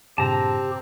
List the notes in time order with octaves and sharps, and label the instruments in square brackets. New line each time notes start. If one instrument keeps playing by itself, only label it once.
[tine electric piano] G2 A#2 C#3 [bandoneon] C4 [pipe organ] G4 [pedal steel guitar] A5 A#5